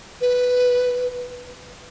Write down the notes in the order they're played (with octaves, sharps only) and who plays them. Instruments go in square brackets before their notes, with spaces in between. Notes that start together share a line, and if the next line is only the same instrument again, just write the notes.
[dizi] B4